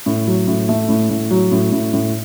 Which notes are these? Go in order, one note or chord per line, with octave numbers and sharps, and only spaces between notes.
A2
F#3
A2
A3
A2
A2
F#3
A2
A2
A2